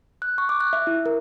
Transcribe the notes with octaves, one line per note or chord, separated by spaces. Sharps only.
F#6
C#6
D6
F#6
E5
E4
A#4